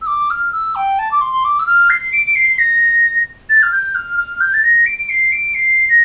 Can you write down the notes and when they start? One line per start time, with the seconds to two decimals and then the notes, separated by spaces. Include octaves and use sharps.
0.02 E6
0.07 D6
0.30 F6
0.53 E6
0.76 G5
0.99 A5
1.12 D6
1.21 C6
1.45 D6
1.59 E6
1.67 F6
1.90 C7
2.13 D7
2.26 D7
2.36 C7
2.50 C7
2.59 A#6
3.49 A6
3.63 F6
3.72 G6
3.95 F6
4.18 F6
4.41 G6
4.54 A6
4.64 A#6
4.86 D7
4.99 D7
5.10 C7
5.32 D7
5.55 C7
5.89 A#6